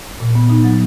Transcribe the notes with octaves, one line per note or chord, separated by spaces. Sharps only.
A#2
B3
D#4
F#3